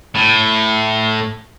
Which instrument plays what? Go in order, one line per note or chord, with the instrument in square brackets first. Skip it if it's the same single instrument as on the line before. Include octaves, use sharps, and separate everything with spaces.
[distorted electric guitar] A2